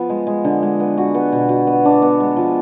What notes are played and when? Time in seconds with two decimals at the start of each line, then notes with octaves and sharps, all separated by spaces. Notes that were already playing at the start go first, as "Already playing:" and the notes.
Already playing: F3 B3
0.10 G#3
0.27 G#3
0.44 D3
0.63 G#3
0.80 B3
0.97 F#4
1.15 B3
1.33 B2
1.49 F#4
1.67 B3
1.85 D4
2.02 B3
2.20 G#3
2.37 F3